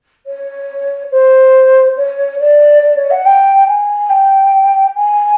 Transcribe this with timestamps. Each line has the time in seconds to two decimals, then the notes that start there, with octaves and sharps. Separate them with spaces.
0.26 C#5
1.12 C5
1.97 C#5
2.40 D5
2.83 D5
2.96 C#5
3.11 F#5
3.25 G5
3.68 G#5
4.10 G5
4.95 G#5